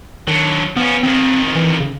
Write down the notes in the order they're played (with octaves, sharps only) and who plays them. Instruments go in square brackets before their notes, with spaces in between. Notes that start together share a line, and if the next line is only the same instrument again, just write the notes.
[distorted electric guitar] D3 F#3 [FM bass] D#3
[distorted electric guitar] F3 C#4 [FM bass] B3
[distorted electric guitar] F2 D#3 [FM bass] C4
[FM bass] E3
C#3